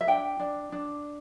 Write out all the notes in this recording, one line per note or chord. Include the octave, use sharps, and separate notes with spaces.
E5
D4 G5
D4
D4